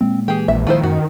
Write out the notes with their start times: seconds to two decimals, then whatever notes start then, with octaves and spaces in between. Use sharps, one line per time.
0.01 A#2 G#3 A#3 C4
0.28 E3 G4 G#4
0.48 A#1 E5
0.67 D#3 F3 E4 C5
0.83 F#2 F#4